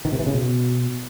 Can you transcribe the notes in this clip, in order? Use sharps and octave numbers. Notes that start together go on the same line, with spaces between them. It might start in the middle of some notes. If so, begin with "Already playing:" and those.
D#3
C3
E3
C#3
B2